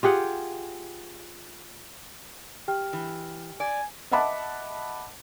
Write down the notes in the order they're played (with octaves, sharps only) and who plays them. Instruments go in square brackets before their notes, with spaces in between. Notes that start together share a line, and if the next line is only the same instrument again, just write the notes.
[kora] F4 G4 G#4 F#5
[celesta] G4 G5 F6
[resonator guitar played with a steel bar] E3
[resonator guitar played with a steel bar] D5 [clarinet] G#5
[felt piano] D#5 E5 F#5 A5 B5 D6